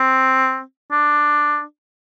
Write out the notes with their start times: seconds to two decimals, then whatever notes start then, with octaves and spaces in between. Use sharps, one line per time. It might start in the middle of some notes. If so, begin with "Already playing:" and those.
Already playing: C4
0.92 D4